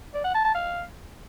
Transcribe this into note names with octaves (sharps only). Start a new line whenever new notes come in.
D5
F#5
A5
A5
F5